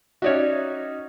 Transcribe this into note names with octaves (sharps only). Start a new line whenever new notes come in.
C#4 D#4 F#4 C#5 D5 E5